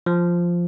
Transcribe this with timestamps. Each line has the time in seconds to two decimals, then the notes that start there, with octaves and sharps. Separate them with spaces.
0.06 F3